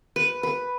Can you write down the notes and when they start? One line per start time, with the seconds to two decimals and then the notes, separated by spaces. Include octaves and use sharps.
0.16 B4
0.43 B4